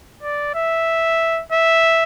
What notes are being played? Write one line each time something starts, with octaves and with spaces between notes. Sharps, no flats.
D5
E5
E5